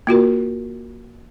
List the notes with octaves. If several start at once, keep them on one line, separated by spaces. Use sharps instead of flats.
A#3 F4 F#4 A#4